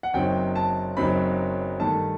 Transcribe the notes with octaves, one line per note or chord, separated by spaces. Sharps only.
F#5
F#1 F#2 F#3 C4 D#4 G5
A5
F#1 F#2 F#3 C4 D#4 B5
G2 D#3 A3 A5